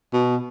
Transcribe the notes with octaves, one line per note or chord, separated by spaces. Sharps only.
B2